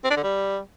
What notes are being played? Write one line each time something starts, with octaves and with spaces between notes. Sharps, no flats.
C4
D4
D3
G3